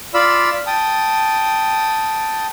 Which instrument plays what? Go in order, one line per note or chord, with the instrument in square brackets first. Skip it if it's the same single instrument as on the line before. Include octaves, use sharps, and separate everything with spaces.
[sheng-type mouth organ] F4 D5 F5 B5 E6
G5 A5 D#6